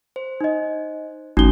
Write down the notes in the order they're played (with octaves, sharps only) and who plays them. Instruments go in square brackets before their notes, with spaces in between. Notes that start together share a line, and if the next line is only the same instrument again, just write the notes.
[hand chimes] C5
[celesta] D#4 D#5
[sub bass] G#1 [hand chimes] A3 C#4 F#4 [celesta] D#4 G7